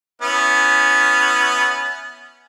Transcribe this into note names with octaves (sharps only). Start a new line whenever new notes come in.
B3 C#4 E4